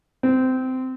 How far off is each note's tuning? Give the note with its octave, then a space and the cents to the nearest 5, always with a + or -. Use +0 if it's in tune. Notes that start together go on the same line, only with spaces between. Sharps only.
C4 -20